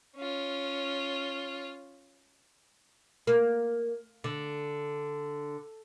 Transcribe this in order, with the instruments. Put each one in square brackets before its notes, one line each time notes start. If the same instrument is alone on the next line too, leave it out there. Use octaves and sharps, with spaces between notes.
[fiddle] C#4 F4
[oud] A#3
D3